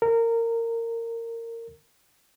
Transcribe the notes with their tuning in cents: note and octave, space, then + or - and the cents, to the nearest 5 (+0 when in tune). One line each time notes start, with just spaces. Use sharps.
A#4 -20